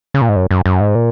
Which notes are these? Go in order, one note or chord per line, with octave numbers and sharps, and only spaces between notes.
C#3
A#2
G#2
F#2
F#2
F#2
G#2
A#2